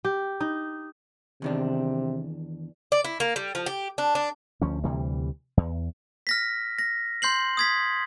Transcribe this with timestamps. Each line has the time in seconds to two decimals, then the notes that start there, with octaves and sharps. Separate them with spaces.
0.05 G4
0.41 D#4
1.42 E2 C3 D#3 D4
2.92 D5
3.04 E4
3.20 A#3
3.36 G3
3.55 F3
3.66 G4
3.98 D4
4.15 D4
4.62 D2 F3 C#4
4.84 D2 C3 E3 G3
5.57 E2
6.27 F6 A#6 B6
6.78 A#6
7.22 C6 G6 C7 F#7
7.57 D#6 G#6 B6